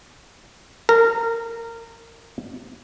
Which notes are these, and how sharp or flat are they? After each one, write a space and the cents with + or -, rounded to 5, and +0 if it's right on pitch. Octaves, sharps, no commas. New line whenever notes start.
A#4 -20